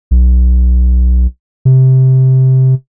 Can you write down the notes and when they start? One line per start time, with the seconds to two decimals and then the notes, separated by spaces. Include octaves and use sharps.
0.11 B1
1.65 C3